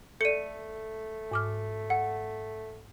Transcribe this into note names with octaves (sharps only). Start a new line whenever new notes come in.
A3 A4 D5 C#7 D#7
G#2 D6 F6
F#5